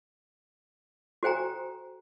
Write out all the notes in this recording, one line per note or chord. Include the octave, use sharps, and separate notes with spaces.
F#4 A4 C5 G5 G#5 A#5